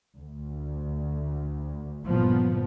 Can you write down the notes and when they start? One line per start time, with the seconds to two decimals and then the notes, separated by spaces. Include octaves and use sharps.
0.16 D2
2.06 G1 A#2 F3 B3